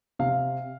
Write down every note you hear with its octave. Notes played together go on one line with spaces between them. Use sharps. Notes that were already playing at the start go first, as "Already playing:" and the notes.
C3 F5